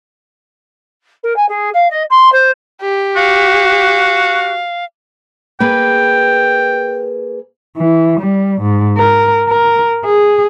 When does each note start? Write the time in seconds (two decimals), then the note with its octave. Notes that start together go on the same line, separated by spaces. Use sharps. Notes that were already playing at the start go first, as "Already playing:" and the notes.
1.23 A#4
1.36 G#5
1.48 G#4
1.73 F5
1.90 D#5
2.10 C6
2.32 C5
2.82 G4
3.16 F#4 F5
5.60 A#3 G#4 B4 G5
7.77 E3
8.20 G3
8.62 G#2
8.97 A#4
9.49 A#4
10.05 G#4